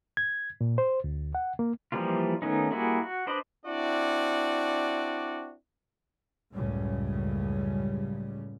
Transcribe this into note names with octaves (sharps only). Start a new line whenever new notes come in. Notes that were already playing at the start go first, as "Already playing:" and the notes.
G#6
A#2
C5
D2
F#5
A#3
E3 F3 G3 A#3 F4
D#3 A3 B3 C#4 D#4
G3 A#3 E4 F#4 G#4
F#4
D4 B4 C5 D5 D#5
C4 D4 E4 F#4 D5
C#2 F#2 A2 C#3 G3